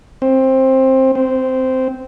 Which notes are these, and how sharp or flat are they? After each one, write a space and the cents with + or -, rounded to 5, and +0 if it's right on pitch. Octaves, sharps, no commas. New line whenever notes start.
C4 +15
C4 -10